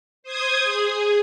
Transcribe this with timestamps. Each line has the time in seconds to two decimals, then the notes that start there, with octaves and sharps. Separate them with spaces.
0.23 C5 D#6 G#6
0.62 G#4